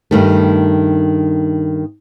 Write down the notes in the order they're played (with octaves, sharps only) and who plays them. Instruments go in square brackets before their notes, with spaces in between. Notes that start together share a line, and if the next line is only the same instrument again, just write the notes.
[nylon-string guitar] G2 D#3 A3